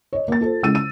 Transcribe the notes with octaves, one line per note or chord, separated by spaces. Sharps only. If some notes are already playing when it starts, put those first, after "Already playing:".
C#5 D#5
A#3 A6
F4 A4 C5
C#3 G#3 E4 E6 A6 D#7
E6 D#7